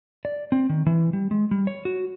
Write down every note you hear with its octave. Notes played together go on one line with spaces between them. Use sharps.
D5
C4
D#3
E3
G3
G#3
G3
C#5
F#4